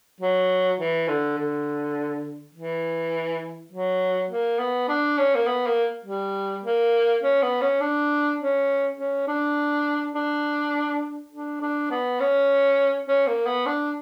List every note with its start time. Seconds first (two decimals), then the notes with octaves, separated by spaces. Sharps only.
0.20 F#3
0.80 E3
1.08 D3
1.38 D3
2.54 E3
3.72 F#3
4.31 A#3
4.59 B3
4.88 D4
5.18 C#4
5.35 A#3
5.47 B3
5.66 A#3
6.05 G3
6.64 A#3
7.23 C#4
7.42 B3
7.61 C#4
7.81 D4
8.40 C#4
8.97 C#4
9.27 D4
10.15 D4
11.31 D4
11.61 D4
11.91 B3
12.20 C#4
13.08 C#4
13.27 A#3
13.46 B3
13.66 D4